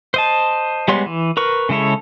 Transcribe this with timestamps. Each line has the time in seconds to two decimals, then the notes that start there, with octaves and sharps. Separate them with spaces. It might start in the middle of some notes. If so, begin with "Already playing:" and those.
0.14 C5 D#5 A5
0.88 G3 G#3 B3 C#5 C6
1.06 E3
1.37 A#4 B4 C#6
1.69 C#3 G#3 E4 A4 C#5